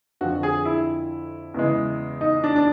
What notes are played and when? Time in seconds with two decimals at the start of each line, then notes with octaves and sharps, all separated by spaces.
0.21 F2 D3 F3 F#4
0.43 G#4
0.65 E4
1.54 E2 C#3 E3 G#3
2.21 D#4
2.44 D4
2.56 D4